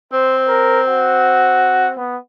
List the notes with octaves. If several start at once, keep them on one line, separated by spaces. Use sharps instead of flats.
C4 C5
A#4
F#4
B3